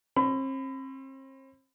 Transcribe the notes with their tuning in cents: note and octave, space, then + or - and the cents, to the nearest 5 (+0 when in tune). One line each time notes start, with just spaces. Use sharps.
C4 +40 B5 +30